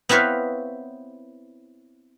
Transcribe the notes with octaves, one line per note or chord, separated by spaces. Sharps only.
B3 C4 E4 B4 C#5 F5